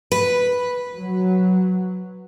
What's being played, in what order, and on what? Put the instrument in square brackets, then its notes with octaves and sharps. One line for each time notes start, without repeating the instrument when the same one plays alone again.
[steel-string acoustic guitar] B4
[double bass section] F#3